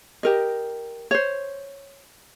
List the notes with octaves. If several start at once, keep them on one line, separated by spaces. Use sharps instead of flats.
G4 A#4 D#5
C5 C#5